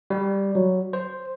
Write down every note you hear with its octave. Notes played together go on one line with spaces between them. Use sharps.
G3
F#3
C5